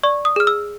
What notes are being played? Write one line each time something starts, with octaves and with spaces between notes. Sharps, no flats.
D5 C#6
D#6
G#4 F6
E6